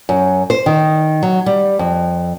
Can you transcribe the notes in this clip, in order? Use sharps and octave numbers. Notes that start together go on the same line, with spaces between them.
F#2
C5
D#3
F#3
G3
F2